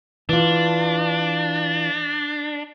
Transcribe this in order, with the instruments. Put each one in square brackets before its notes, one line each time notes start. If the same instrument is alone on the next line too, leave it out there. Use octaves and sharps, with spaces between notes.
[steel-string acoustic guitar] E3 F4 [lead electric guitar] D4